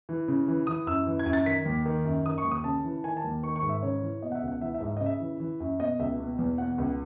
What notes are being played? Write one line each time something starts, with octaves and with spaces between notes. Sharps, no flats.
E3
C#3
E3
E3 D#6
F#2 E6
E3
G#6
F#2
A6
D#3 B6
D#2
D#3
F#2
D#3 D#6
C#6
D#2
D#6
C#3 A5
E3
D#3 G#5
A5
D#2
D#3 C#6
C#6
G#2
E5
C#3 C#5
E3
B2 D#5
F#5
E5
C#2
F#5
E3 E5
E5
G#2
E5
C#3 D#5
E5
E3
E3
F#2
B2 D#5
C#2 E5
B2
E2
B2 F#5
C#2